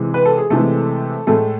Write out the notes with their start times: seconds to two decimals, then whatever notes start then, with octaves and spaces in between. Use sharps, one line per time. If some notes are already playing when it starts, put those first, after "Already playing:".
Already playing: C3 E3 G#3
0.14 B4
0.26 A4
0.38 G#4
0.50 C3 E3 G#3 A3 A4
1.27 A2 G#3 A3 A4